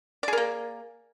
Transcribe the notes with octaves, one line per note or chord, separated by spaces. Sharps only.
A#3 G#4 A#4 D5